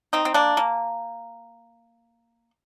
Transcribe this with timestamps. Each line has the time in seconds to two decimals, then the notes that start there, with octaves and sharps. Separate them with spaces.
0.13 C4 D#4
0.25 C4
0.34 A#3 D4
0.57 A#3